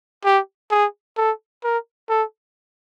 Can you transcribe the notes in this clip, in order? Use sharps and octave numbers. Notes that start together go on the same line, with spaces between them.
G4
G#4
A4
A#4
A4